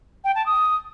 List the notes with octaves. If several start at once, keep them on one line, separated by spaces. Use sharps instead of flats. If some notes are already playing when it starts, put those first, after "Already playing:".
G5
A5
D#6